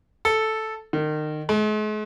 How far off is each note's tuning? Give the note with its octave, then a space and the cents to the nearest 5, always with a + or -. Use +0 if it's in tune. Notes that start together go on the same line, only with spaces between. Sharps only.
A4 -5
D#3 -30
G#3 +45